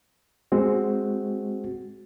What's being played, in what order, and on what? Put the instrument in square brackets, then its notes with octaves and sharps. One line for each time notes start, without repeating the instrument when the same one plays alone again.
[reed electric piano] G#3 C4 F#4